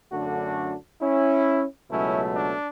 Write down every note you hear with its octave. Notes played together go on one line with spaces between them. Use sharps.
F#2 D3 A3 D4 F#4
C#4 E4
C#2 B2 F#3 A3 C#4 E4
D4